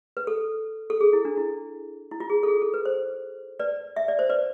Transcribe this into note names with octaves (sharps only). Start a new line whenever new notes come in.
B4
A4
A4
G#4
E4
D4
E4
E4
F4
G#4
A4
G#4
A4
B4
C5
B4 D5
E5
D5
C5
B4 D5